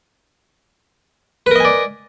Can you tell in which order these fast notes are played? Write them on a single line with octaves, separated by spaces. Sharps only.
B4 A#4 D#5 G#5 D5